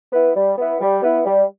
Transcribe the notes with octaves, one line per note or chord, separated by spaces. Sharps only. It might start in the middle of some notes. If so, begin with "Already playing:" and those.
B3 E4 B4
G3
B3 E4 B4
G3
B3 E4 B4
G3